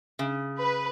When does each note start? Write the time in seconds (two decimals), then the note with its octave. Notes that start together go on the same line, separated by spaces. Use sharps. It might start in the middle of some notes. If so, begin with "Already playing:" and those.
0.19 C#3
0.59 B4